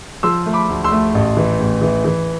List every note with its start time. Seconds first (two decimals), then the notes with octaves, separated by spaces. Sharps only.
0.23 F3 C6 E6
0.46 A3
0.53 B5 D6
0.69 D2
0.84 C6 E6
0.92 A3
1.15 A1
1.37 E3
1.60 A1
1.81 E3
2.04 E3